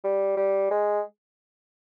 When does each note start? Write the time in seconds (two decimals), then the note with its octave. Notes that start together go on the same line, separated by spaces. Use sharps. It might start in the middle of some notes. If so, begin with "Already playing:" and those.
0.04 G3
0.37 G3
0.71 G#3